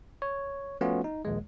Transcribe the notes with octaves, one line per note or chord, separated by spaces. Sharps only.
C#5
F3 A3 B3 C#4 F4 F#4
D#4
A#1 D#2 G#3